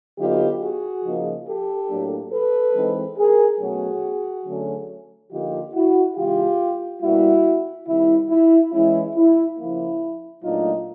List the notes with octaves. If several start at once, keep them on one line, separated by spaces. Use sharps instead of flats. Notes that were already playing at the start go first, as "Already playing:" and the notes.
D3 F#3 B3 D#4 F4 G4
F#4 G#4
C#3 F3 A#3 D#4
G4 A4
A2 F#3 A#3 D4
A4 B4
E3 G#3 C4 D#4
G#4 A#4
B2 F#3 A3 C#4 F#4 G#4
D3 F#3 A3 C#4
D3 F3 A#3 D#4 F4 G4
E4 F#4
C#3 E3 G#3 F4 G4
B2 G3 A#3 E4 F#4
C3 D#3 G3 E4
E4
E3 G#3 C#4 E4
E4
C#3 F3 A#3 E4
A#2 F#3 A3 D4 D#4 F4